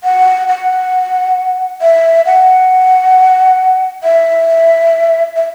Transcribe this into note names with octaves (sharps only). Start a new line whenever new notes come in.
F#5
F#5
E5
F#5
E5
E5